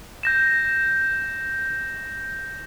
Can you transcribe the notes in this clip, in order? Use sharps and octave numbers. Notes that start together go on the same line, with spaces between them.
G6 A#6 E7